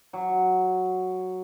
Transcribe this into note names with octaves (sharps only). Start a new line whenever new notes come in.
F#3